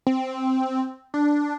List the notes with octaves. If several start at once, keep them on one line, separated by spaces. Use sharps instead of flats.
C4
D4